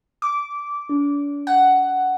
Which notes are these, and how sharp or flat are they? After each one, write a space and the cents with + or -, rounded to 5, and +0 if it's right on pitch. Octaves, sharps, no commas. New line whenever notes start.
D6 -15
D4 -40
F#5 +10